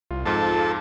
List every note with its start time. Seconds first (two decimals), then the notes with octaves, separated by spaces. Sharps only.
0.11 C2 F4
0.26 F2 G#2 F4 A4